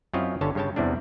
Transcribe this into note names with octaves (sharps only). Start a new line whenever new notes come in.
F#2 C4 E4 F4 C#5 D#5
G1 D3 C#4 C#5 A5
G2 C#3 C#5 G5 A5
E2 C3 E3 G3 D4